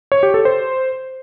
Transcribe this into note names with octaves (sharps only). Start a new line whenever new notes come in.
C#5
G4
A4
C5